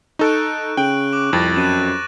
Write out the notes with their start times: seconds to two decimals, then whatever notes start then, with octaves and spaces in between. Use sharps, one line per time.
0.19 D#4 A4 C#6 F#6 D7
0.77 C#3 G5 F#6 D7 F#7
1.13 C#6 D6 F#6
1.33 C2 F2 A6 A#6
1.56 F#2 F#6 D#7 E7